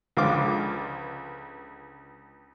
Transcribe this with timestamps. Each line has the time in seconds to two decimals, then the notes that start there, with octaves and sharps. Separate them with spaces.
0.17 C#2 D3 F3 G#3 F5 D6